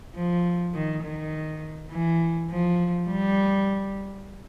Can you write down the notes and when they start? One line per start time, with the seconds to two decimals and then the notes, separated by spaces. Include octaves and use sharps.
0.15 F3
0.74 D#3
1.03 D#3
1.91 E3
2.50 F3
3.09 G3